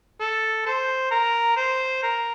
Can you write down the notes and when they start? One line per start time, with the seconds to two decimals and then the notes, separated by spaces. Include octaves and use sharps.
0.21 A4
0.66 A4 C5
1.11 A#4
1.56 C5
2.03 A#4